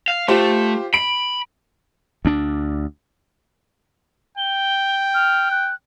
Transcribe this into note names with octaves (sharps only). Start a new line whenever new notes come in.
F5
A3 F4 G4 C5
B5 D7
D2 D4
G5 G7
F6
F#6